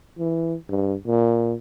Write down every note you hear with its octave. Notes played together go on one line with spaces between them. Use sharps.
E3
G2
A#2